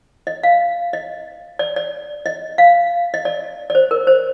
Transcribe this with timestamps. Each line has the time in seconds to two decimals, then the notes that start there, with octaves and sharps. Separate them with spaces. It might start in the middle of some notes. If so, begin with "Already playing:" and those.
0.27 D#5
0.43 F5
0.93 D#5
1.59 D5
1.76 D5
2.26 D#5
2.58 F5
3.14 D#5
3.25 D5
3.70 D5
3.75 C5
3.91 A#4
4.07 C5